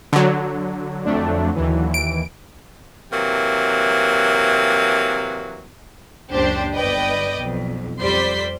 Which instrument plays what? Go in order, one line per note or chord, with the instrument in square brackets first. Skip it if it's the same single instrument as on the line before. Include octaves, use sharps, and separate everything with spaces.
[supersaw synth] D3 F#3
[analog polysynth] F2 A3 D4
D#2 E3
[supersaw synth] D7
[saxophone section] C3 E3 F#3 A#3
[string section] C#2 F#2 A#2 D4 G4 C5
G1 B4 D5 D#5 G5
B1 F2
F2 G3 C5 D5 C6 B6